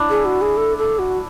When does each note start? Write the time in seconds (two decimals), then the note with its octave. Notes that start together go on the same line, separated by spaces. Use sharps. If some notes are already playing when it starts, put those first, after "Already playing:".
Already playing: D4 E4
0.10 G#4
0.25 F#4
0.41 G#4
0.57 A4
0.78 A4
0.99 F#4